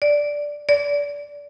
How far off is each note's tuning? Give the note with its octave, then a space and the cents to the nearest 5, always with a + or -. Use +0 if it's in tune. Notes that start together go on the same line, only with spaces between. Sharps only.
D5 -5
D5 -25